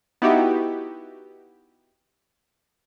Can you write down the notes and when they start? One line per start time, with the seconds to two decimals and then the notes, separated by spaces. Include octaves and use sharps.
0.22 B3 D#4 E4 F#4 G4